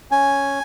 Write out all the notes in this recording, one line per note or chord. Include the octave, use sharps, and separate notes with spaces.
C#4 G#5